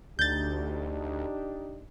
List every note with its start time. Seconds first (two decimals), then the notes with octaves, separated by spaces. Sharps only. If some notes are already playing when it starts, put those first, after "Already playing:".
0.19 D2 D4 D#4 G4 G6 A6